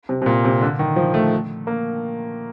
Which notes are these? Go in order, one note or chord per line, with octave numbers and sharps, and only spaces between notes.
C3
C3
A#2
C3
D3
D#3
F3
A3
A#3